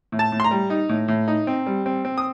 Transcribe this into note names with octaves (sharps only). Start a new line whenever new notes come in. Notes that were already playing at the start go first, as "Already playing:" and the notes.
A2
A5
A2
C6
A#5
G3
D#4
A2
A2
D#4
C4
G3
C4
C4
D#6